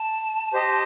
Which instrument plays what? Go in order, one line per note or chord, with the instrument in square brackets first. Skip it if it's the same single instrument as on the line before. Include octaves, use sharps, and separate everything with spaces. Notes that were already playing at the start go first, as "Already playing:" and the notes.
Already playing: [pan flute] A5
[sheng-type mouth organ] G4 C5 D#5